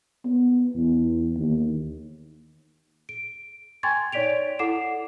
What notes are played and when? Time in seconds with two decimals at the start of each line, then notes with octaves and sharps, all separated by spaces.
0.25 B3
0.75 E2
1.37 D#2
3.09 D7
3.83 G5 G#5 C6 C#6 G#6 A6
4.12 D#4 C#5 D5 B6 D7 F7
4.59 E4 A4 F#5 D6 C7 E7